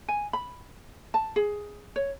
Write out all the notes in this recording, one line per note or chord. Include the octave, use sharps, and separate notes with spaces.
G#5
B5
A5
G#4
C#5